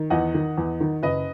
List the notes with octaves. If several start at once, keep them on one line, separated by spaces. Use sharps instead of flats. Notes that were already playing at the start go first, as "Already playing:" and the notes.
Already playing: D#3
E2 D#5 F#5
D#3
E2
D#3
F#1 B4 D#5